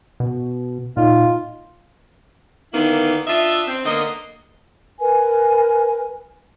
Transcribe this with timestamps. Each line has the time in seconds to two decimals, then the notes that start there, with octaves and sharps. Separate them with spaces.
0.20 B2
0.97 A#2 D#4 F4
2.73 D3 D#3 A#3 B3 D#4 E4
3.27 D4 F4 D#5 E5
3.67 C4
3.85 D3 A#3 B3 D#5
4.99 A#4 B4 G#5